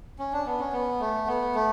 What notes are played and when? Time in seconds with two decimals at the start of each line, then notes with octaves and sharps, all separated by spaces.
0.19 C#4
0.33 D4
0.46 B3
0.59 C#4
0.73 B3
1.00 A3
1.27 B3
1.55 A3